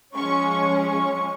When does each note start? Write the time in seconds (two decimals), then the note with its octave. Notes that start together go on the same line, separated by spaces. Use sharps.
0.16 F3 G#3 C#4 C#6
0.51 C#6
0.86 C#6